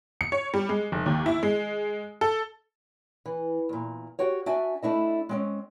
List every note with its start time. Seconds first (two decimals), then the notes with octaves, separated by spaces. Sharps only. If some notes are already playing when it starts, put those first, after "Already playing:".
0.21 C#7
0.32 C#5
0.54 G3
0.69 G#3
0.92 F1
1.06 D#2
1.26 E4
1.43 G#3
2.21 A4
3.26 E3
3.69 E2 A#2
4.19 F#4 G4 C#5
4.46 D4 F#4 E5 G#5
4.82 A3 D4 E4 D#5
5.29 G#3 C4 C#4